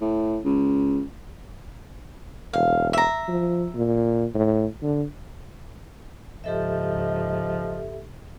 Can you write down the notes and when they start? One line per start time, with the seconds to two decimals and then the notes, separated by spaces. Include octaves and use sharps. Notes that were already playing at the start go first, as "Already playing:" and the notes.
0.01 A2
0.45 C#2
2.53 E1 F5
2.93 E5 A#5
3.28 F3
3.75 A#2
4.35 A2
4.82 D3
6.44 C#2 G#2 F3 G4 A4 D#5 E5